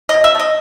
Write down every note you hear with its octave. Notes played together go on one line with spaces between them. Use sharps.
B2 D#5
E5
A3
D#5